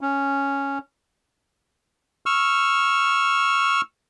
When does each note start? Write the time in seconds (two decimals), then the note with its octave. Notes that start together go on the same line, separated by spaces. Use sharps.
0.01 C#4
2.26 C#6 E6 F6